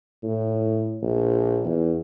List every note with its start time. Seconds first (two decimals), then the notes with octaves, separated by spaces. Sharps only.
0.23 A2
1.02 A#1
1.65 E2